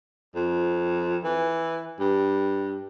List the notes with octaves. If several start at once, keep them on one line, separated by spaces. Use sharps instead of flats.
F2
E3
G2